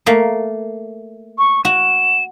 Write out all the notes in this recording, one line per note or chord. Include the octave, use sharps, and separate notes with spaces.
A3 A#3
C#6
F#4 E7